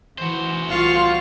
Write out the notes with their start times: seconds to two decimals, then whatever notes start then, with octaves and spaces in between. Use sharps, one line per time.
0.18 E3 F#4 C5
0.69 C2 F4 F5 C#6